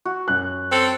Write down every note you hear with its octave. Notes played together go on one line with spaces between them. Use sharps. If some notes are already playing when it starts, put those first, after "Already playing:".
F#4
F#2 F#6
C4 A4